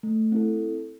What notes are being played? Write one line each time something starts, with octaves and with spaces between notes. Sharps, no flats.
A3
C4 E4 A4